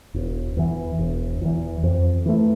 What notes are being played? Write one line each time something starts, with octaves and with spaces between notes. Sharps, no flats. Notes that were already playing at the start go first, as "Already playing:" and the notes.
E1
E2 E3
E1
E2 E3
F2
E3 A3